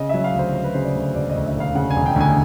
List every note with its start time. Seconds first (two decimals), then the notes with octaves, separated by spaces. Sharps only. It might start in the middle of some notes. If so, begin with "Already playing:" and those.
Already playing: C#3 D#5
0.09 F#3 E5
0.24 F5
0.34 D2 C5
0.54 F#3 C5
0.64 B4
0.74 C#3 C5
0.84 D5
0.95 D2
1.15 E1 D5
1.30 D#5
1.35 D2
1.46 E5
1.55 E1
1.60 F5
1.75 C#3 F#5
1.90 G#5
1.96 E1
2.06 G5
2.16 D2 G#5